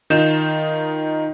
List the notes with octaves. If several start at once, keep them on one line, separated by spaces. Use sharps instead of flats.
D#3 D#4 F4 G6 E7